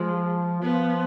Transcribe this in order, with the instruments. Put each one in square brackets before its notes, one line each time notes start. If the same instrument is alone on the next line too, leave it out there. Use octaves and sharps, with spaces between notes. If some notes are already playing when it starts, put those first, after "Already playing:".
Already playing: [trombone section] F3 [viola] G#3
[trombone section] F3 [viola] B3